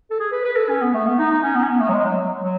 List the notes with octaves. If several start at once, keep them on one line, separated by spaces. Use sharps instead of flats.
A4
G#4
B4
B4
A4
C#4
B3
A3
B3
D#4
D#4
C#4
B3
C#4
B3
A3
F#3
G#3
F#3
F#3